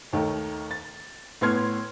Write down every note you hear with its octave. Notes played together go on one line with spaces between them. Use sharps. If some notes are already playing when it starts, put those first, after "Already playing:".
D#2 D#3 A3
A6
A2 B3 C6 F6 G#6